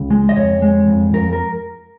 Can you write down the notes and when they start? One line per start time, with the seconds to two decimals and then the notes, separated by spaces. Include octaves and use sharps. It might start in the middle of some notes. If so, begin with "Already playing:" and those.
Already playing: C#2
0.10 G#3
0.29 D#5
0.36 F2 C#5
0.62 G#3
0.87 F2
1.14 F2 A#4
1.33 A#4